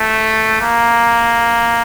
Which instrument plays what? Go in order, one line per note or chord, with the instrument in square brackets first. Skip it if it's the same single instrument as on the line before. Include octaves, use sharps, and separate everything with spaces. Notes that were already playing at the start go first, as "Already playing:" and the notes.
Already playing: [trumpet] A3
A#3